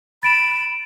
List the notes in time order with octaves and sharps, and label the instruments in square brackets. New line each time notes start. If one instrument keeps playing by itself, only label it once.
[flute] B5 [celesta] A6 D7 E7